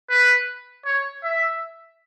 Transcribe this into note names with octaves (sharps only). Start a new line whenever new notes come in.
B4
C#5
E5